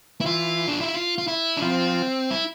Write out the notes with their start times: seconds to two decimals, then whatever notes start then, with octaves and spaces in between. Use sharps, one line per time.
0.21 E4
0.26 E3 F4
0.68 D4
0.81 E4
0.94 F4
1.18 F4
1.28 E4
1.57 D4
1.62 F3 C4
2.31 E4